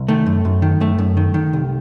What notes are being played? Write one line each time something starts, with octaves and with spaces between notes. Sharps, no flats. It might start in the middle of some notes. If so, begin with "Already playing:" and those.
Already playing: C2
D#3 A3
F#2
F#2
D#3
F#2 A3
F#2
D#3
D#3
C2